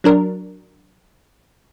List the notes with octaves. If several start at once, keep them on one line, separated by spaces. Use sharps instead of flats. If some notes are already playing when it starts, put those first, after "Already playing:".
F#3 D4 A#4